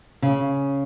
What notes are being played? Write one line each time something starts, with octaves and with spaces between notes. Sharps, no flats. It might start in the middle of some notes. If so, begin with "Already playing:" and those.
C#3